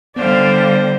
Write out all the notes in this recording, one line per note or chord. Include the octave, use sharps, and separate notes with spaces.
D3 G3 B3 C5 D5 F5